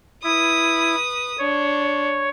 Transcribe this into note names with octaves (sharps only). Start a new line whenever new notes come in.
E4 B4 D#6
D4 C#5